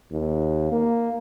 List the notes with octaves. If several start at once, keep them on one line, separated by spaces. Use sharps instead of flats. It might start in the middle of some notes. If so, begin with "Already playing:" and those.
D#2
A#3